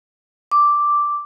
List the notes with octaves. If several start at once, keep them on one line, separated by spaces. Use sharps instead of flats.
D6